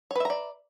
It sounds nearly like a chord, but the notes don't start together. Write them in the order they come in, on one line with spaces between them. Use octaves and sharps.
C#5 B4 E5 A#5 D5